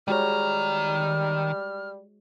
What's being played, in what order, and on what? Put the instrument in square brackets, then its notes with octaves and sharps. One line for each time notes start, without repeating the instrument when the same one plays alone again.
[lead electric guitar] D#3 A#5 [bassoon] G3 [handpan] G#3 F#4 C#5 [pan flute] F6